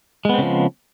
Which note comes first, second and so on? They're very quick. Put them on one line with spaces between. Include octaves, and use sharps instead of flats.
G#3 B3 C4 C#3 F3